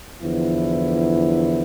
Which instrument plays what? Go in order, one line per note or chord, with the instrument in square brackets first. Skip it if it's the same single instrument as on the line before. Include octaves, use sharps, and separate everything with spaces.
[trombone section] E2 D3 F3 B3 E4